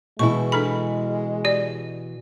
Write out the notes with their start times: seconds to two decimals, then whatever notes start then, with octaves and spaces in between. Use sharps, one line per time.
0.19 B2 E3 G#3 E4 C#6
0.52 D4 A4 B5
1.45 G4 D5